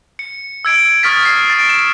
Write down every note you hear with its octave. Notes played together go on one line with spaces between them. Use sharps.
C#7
E6 G#6 D7
C#6 D#6 F6 G#6 A6 B6
C7
A6 D7
E7